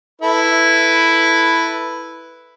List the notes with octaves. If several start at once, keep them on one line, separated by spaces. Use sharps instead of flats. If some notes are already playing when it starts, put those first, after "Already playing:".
E4 A4 B4